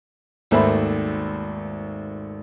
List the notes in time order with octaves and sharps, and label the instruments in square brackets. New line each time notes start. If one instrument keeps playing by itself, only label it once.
[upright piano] G#1 D#2 A3 C5 E5 B5